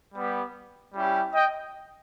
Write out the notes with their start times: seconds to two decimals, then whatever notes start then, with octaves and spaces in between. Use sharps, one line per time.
0.15 G3 B3 G4
0.94 G3 C#4 E4 G4
1.34 D#5 G5